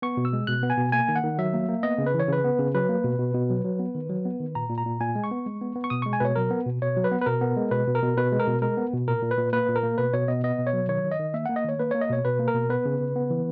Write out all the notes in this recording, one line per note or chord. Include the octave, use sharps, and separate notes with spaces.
B3 C#6
B2
E6
G#3
B2 F#6
B3
G#5
B2
A#3 G#5
D#3
F#5
D#3
F#3 E5
A#3
A#3
B3 D#5
C#3
B4
E3
C#5
C#3 B4
B3
C#3
F#3 B4
A#3
B2
B2
B2
F#3
F#3
B3
D#3
F#3
B3
D#3
A#2 A#5
A#2
A#5
A#2
A#2 G#5
G#3
C#6
B3
G#3
B3
B3
C#6
B2 D#6
G#3 C#6
G#5
B2 B4 C#5
F#3 A#4
B3
B2
B2 C#5
F#3
B4
B3
B4
B2 A#4
B3
G#3
B2 B4
B2
A#4
B2
B2 B4
G#3
A#4
B2
G#3 A#4
B3
B2
A#2 A#4
A#2
B4
A#2
A#3 B4
A#2
A#4
A#3
B2 B4
B2 C#5
B3 D#5
B3 D#5
B2
C#5
F#3
D#3 C#5
D#3
D#5
D#3
A#3 E5
A#3 F#5
D#5
D#3 C#5
A#3 B4
A#3 C#5
D#5
B2 C#5
B2 B4
A#3
A#4
B2
B3 B4
C#3
C#3
B3
E3